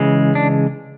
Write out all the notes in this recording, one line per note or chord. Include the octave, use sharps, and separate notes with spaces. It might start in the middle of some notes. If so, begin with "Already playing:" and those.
Already playing: C#3 E3 G#3
D4